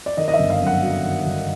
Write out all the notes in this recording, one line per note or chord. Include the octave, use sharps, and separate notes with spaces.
D5
D#3 D#5
D#5
E5
G1
F5
F#2
F#5
F#3
D#3
G1